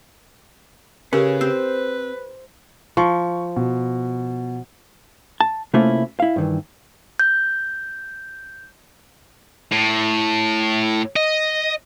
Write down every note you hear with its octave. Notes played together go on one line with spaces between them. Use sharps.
C#3 C#4 G4 A#4 B4
C4 G4 C5
F3 C#6
B2
A5
C3 A3 A#3 C#4 E4 F4
E4 F5
G2 D#3 E3
G6
A2
D#5